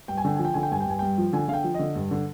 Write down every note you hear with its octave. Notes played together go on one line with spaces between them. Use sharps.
G2 G5
G#5
D3 G5
F3 G#5
G5
D3 G#5
G5
G2 G#5
G5
G2 G#5
G2 G5
F3
D3 G#5
D3 F5
G5
F3
D3 D#5
G2
D3